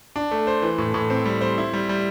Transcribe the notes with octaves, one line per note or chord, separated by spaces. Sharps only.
D4
A3
C5
E3
A2
A2
C4
G3
C5
E4
G3
G3